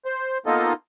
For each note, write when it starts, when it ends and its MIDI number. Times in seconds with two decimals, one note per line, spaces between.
0.05 0.38 72
0.46 0.73 58
0.46 0.73 59
0.46 0.73 63
0.46 0.73 65
0.46 0.73 69
0.46 0.73 75